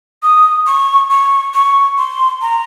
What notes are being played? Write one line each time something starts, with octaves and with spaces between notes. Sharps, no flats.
D#6
C#6
C#6
C#6
C6
A#5